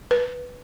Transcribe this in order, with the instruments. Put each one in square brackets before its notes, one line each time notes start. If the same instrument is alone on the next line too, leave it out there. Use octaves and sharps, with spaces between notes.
[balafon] B4